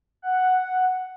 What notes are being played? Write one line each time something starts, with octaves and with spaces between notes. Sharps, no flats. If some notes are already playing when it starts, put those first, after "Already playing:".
F#5